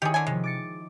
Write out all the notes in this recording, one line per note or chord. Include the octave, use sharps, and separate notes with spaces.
D#3 E4 G4 G#4 C#5
D3 G#5
C3 F3 G#3
D6 A6 C#7